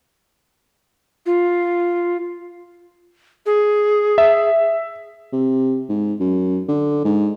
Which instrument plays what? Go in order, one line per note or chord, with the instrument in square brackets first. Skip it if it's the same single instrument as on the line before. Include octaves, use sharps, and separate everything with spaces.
[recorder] F4
G#4
[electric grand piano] E5
[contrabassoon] C3
G#2
F#2
D3
G#2